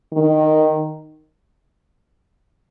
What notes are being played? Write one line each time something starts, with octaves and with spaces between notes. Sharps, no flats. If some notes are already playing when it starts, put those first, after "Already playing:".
D#3